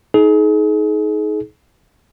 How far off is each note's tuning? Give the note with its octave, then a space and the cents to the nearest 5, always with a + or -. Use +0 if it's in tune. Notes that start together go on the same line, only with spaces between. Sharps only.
D#4 +25 G#4 +35